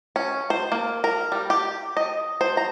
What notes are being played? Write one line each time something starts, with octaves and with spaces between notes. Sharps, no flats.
C#4
C5
A#3
A#4
G3
G4
D#5
C5
A#5